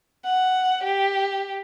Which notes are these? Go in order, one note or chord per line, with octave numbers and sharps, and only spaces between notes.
F#5
G4